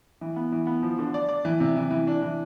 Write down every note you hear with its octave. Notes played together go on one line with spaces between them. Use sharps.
E3
B3
E3
B3
F3
D3
D5
D5
E3
C3
E3
E3
D4
E3